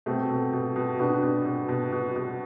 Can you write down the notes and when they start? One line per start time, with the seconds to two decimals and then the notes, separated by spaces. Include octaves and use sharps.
0.06 B2 A3 C4
0.30 B2
0.53 B2
0.76 B2
0.99 B2 B3 D4
1.23 B2
1.45 B2
1.69 B2
1.92 B2
2.16 B2